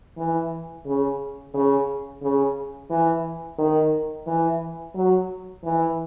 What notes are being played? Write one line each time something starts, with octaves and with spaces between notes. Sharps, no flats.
E3
C#3
C#3
C#3
E3
D#3
E3
F#3
E3